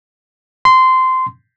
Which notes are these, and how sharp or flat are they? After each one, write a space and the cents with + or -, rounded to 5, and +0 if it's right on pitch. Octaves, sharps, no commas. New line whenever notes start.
C6 -15